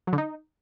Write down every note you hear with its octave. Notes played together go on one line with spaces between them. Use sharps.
F#3
D3
D#4